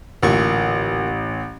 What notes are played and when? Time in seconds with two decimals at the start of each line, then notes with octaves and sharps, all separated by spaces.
0.23 A1 A#2 D3 C#6